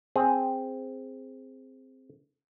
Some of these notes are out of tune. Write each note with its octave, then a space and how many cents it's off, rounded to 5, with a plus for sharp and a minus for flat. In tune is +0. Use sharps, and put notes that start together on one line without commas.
C4 +0 G#4 +0